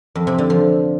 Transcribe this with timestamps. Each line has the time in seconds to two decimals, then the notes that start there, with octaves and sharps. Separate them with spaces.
0.15 F2
0.27 C3
0.38 D3
0.50 F3